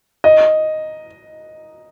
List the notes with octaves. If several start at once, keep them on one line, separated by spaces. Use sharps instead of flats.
D#5